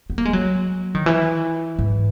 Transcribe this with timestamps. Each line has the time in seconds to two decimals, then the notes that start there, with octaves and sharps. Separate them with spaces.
0.10 B3
0.18 A#3
0.25 G#3
0.33 F#3
0.95 D#3
1.06 E3
1.79 G#2